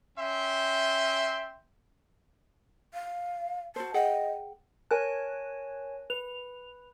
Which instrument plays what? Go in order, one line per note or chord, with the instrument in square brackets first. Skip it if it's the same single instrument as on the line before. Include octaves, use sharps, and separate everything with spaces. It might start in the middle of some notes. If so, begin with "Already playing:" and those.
[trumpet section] C#4 E5 G5 C6
[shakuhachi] F5
[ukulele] F#4 C5 [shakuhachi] A5
[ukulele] G#4 F#5 G5 [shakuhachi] D#5
[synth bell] A#4 F#6 [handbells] C#5 G#5 A5
[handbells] B4 [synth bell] F7